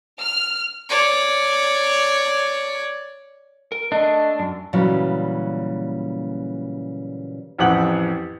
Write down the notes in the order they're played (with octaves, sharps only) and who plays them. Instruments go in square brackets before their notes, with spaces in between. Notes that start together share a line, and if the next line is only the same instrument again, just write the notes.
[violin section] F6
[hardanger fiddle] C#5 D5
[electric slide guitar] A#4
[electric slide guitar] A3 D#5 [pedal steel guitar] D4
[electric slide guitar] F#2
[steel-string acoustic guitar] A#2 C#3 E3 F#3 G3
[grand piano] A1 F2 G4 F#5 F#7